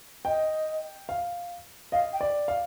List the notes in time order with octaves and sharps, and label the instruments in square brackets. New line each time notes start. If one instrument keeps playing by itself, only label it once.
[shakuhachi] D#5 [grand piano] G5
[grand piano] F5
[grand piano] D#5 [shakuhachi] F5
[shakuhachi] G5
[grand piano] D5
F5